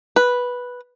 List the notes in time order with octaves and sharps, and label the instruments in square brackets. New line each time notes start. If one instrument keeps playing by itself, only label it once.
[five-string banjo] B4